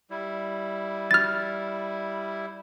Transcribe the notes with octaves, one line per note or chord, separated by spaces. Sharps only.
G3 E4
F6 A6